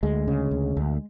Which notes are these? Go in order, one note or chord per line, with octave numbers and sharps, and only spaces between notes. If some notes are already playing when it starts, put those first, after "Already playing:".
D2 G#3
C#3
D2
D2